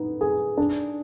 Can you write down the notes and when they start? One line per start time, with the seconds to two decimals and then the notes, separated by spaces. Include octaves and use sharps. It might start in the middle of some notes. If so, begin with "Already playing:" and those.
Already playing: B3 D#4
0.21 G#4
0.58 D4